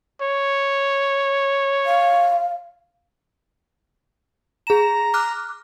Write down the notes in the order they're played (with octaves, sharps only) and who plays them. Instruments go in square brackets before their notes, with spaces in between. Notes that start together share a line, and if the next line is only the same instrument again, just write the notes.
[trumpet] C#5
[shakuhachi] F5
[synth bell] G#4 E7 [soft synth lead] A#5
[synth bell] D6 F6 F#6